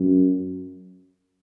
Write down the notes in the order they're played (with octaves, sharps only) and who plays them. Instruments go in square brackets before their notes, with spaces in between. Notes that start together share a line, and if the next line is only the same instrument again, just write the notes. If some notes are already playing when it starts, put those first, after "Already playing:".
Already playing: [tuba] F#2